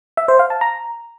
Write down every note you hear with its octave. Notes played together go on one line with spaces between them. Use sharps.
E5
C5
F5
A5
A#5